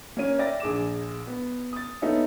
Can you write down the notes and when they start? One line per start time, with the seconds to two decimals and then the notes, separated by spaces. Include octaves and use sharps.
0.17 A#3 C#4 D#7
0.39 D5 E5 G5 A6 A#6
0.60 A#1 G#4 D6 E7
1.27 B3
1.73 D#6 A6
2.02 A#3 B3 D#4 A4 C#5 E5